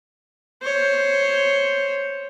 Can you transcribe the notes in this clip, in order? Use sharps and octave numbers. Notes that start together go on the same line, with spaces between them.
C5 C#5